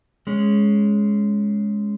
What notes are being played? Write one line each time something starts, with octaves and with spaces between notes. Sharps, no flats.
G#3 C#4